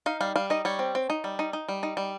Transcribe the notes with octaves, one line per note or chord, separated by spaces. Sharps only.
D#4 F5
G3 F5
G3 F5
D#4 D#5
G3 C#5
C4
C4
D#4
G3
D#4
D#4
G3
D#4
G3